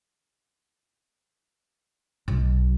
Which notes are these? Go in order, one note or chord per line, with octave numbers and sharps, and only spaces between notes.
B1